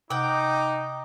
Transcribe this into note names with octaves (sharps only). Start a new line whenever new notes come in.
C3 D#4 F#5 G5 D6